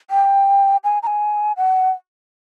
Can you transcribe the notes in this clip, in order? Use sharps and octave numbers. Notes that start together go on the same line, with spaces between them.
G5
G#5
A#5
G#5
F#5